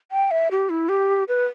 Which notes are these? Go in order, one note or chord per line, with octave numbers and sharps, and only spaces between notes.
G5
E5
G4
E4
G4
B4